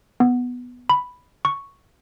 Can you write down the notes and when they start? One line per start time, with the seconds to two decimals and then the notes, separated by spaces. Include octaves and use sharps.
0.20 B3
0.90 B5
1.45 C#6